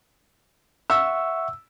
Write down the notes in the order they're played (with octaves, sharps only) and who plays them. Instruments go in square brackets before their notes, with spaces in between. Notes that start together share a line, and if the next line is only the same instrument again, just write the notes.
[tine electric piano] E5 F#5 C#6 [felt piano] E6